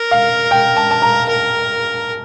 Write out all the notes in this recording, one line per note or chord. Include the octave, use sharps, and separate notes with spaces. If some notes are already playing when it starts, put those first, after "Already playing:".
Already playing: A#4
F5
G5
A5
A5
A#5
A#4